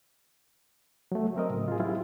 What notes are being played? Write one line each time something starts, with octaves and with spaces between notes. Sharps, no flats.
F#3 A3
F#3 C4 A#4 D#5
A2 C#3
F4 G#4
F#3 C4 E4 F4 G4